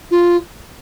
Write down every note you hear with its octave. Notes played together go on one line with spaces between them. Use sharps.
F4